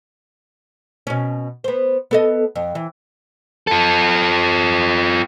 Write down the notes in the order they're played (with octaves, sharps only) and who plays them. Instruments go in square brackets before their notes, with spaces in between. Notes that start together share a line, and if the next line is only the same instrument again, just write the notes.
[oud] B2 C#4
B3 C5
B3 A4 D#5
F2
E3
[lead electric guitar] F4 A4